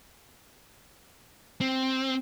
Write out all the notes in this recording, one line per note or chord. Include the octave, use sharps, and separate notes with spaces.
C4